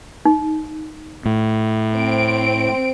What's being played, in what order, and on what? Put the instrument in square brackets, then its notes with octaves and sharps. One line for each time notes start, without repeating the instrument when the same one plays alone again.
[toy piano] D#4
[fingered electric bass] A2
[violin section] C4 D7